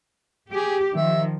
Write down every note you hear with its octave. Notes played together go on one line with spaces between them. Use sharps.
G4 G#4
D#3 F3 E5